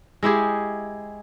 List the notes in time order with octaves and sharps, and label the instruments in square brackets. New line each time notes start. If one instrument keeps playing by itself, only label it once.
[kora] G#3 E4 G4 G#4